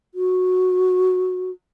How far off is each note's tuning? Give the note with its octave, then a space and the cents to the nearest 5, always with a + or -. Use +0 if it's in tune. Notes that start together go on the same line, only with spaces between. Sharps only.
F#4 -10